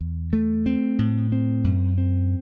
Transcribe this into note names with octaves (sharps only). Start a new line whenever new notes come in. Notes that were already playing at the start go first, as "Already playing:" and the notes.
E2
A3
C4
A2
C4
F#2
C4